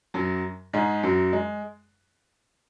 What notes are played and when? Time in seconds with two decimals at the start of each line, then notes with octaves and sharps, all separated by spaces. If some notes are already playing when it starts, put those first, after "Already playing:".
0.14 F#2 F#3
0.73 G#2 G#3
1.03 F#2 F#3
1.33 G#3